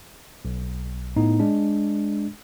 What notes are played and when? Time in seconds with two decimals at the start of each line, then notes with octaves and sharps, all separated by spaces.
0.45 B1
1.16 A2 B3 D#4
1.40 G#3 D4